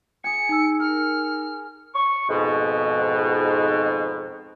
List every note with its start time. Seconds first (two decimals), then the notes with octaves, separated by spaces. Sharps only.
0.24 G#4 G#5 C#7
0.49 D#4 E6
0.80 A#4 F6
1.95 C#6
2.29 F2 G#2 B2